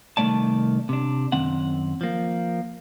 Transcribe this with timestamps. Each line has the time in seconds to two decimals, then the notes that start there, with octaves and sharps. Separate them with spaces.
0.17 C2 D#3 F#3 A3 D5 A5
0.89 C3 D4
1.32 F#2 D#3 C4 F#5
2.01 F3 A#3